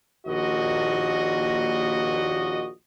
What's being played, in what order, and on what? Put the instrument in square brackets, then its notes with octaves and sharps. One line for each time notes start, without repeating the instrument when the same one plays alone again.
[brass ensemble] A#1 D#2 A#2 F#4 D#5